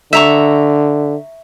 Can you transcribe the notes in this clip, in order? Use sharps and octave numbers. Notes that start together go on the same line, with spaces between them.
D3 E5 A#5 C#6